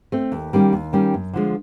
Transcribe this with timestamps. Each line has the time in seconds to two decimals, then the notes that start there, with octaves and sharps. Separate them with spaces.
0.12 A3 C4
0.32 D#2
0.53 D#3 G3 A#3 C#4
0.73 D#2
0.93 D#3 G3 A#3 C#4
1.14 F#2
1.33 D3 F3 G#3